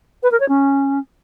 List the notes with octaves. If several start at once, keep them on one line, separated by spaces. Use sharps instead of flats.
B4
A#4
C#5
C#4